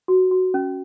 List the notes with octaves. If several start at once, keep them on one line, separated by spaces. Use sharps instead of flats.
F#4
F#4
C#4